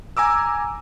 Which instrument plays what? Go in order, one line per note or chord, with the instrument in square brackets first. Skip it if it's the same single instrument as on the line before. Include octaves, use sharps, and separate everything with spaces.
[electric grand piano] G#5 A#5 D6 E6